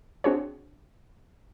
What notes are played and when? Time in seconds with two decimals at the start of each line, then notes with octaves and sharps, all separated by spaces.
0.24 C4 D4 F#4 G#4 C5 C#5